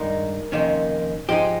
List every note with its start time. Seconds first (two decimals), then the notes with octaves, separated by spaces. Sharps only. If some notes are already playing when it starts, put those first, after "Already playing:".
Already playing: G2 D#3 G#3 D#4 A#4
0.52 F2 C3 D#3 A#3 C#4
1.29 G#2 F3 G#3 D#4 G4